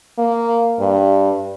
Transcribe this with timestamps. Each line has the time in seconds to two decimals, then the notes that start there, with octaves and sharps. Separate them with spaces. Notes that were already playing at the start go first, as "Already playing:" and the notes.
0.18 A#3
0.80 G2